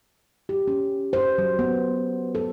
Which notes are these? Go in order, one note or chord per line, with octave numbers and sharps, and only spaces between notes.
G4
C#4
C5
F#3
B3
A4